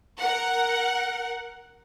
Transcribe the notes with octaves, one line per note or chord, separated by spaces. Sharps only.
A#4 F#5